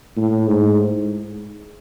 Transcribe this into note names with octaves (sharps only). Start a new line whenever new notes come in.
A2
G#2